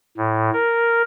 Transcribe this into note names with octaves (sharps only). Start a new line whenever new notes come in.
A2
A#4